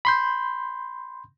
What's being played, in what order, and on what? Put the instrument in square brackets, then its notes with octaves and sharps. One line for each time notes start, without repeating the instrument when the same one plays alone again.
[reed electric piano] B5 C6 G6